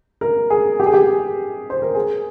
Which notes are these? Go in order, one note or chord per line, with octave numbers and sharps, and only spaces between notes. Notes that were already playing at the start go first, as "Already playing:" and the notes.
A#4
G#4
G4
G#4
G4
C5
A#4
G#4